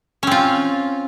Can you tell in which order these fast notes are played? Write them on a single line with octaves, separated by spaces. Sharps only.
C#4 C4 F4